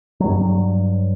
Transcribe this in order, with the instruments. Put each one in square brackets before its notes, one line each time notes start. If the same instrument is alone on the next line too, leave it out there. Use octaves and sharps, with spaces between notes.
[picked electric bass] G2 F#3